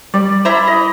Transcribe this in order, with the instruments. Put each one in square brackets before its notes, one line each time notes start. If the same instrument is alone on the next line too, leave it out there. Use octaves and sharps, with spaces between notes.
[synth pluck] G3 [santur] D5
[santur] E4 B5 [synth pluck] C5 E5 A#5
[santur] D#5